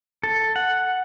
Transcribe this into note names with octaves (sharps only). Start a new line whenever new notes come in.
A4
F#5